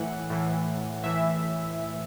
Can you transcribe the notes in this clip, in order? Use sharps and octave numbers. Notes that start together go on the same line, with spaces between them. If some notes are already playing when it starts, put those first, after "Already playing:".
Already playing: A2 E3 F#5
A2 E3
A2 E3 E5